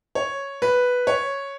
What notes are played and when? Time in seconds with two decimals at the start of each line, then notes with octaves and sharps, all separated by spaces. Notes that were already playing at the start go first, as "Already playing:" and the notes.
0.15 C#5
0.62 B4
1.07 C#5